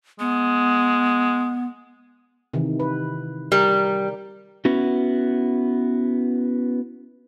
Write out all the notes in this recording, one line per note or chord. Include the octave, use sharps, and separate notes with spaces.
G#3 B3
C3 D#3 E3
B4
G3 A#4
B3 C#4 E4 F#4